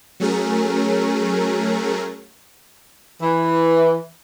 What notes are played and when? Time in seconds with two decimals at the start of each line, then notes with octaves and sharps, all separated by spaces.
0.20 F#3 A3 C#4 G#4 A#4
3.22 E3